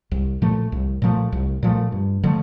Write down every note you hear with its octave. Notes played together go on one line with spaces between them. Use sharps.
C2
A#2 F3 A3
C2
A#2 F3 A3
C2
A#2 F3 A3
G2
D3 F3 A3